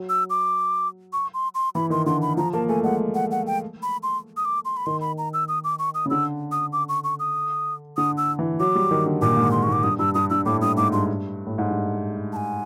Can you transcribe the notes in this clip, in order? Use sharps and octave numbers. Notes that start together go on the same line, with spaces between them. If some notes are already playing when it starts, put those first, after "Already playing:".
Already playing: F#3
E6
D6
C#6
C6
C6
E3 B5
D#3 C6
D3 C6
B5
F3 A#5
A#3 A5
A3 G#5
G#3 F#5
F#5
F#5
G5
B5
C6
D#6
D6
C6
B5
D#3 C6
B5
A#5
E6
D#6
D6
C#6
D#6
C#3
D3 E6
D#6
D6
C#6
C#6
D#6
D3 D#6
E6
E3
F#3 D6
G3
D#3
D3
A#2 D6
G#2
C6
C#6
G#2 D6
G2 D#6
G2 E6
G2 D#6
G2 E6
A2 D6
G2 D#6
G#2 D6
G2 C6
A2
G#2
G2
A5
G#5